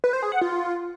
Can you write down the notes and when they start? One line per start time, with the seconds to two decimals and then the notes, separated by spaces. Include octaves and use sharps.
0.04 B4
0.13 C5
0.23 G#4
0.32 F#5
0.41 F4